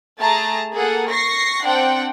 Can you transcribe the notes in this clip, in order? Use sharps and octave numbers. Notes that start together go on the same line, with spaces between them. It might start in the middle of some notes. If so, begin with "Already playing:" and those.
A3 G#4 A5 A#5
A#3 G#4 A4 F#5
C#6 A#6 C7
C4 D4 F#5 G5